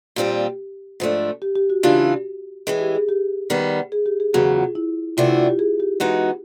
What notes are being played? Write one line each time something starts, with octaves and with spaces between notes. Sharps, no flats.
A#2 G3 C4 F4 G4
G#2 F3 A3 D4
G4
G4
F#4
C#3 E3 A3 D4 F4 G4
A2 E3 G#3 G#4
G4
G#4
G4
D#3 G3 B3
G#4
G4
G#4
E2 C#3 F#3 G#4
F4
E4
C3 E3 A3 D4 F4 F#4
E4
F4
G4
G#4
G4
E3 G#3 B3 D#4 F#4